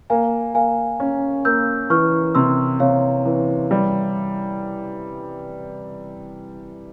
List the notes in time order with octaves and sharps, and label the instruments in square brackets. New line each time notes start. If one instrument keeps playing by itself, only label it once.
[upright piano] A#3 [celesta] F5 G#5
[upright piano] A#3 [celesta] F5 G#5
[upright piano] C#4
[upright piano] A#3 [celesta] E6 G6
[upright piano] E3 [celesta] C#6 F6
[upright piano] C3 [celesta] C6 E6
[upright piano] C3 [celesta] C#5 F5
[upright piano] E3
G3